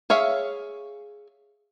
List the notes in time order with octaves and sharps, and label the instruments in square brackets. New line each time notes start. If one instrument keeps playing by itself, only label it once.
[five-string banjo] G#4 C#5 E5 F5